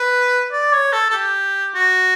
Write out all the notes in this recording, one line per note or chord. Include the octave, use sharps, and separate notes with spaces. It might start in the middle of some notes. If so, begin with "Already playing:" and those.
Already playing: B4
D5
C#5
A4
A4
G4
F#4